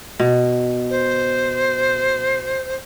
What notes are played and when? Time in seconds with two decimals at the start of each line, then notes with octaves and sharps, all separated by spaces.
0.20 B2
0.90 C5